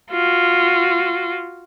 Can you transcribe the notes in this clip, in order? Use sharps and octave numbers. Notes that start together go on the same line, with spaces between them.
F4 F#4